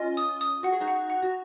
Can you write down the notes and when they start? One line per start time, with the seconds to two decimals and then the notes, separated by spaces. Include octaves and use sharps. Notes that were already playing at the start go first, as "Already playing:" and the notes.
Already playing: C#4 F4 D#5
0.17 D#6
0.41 D#6
0.63 F#4 F#5
0.72 G#4
0.81 D#4 F#4
0.88 F#5
1.10 F#5
1.22 F#4